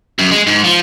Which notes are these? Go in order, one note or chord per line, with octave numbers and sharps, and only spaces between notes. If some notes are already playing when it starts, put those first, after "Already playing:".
F#2
G#3
G#2
F3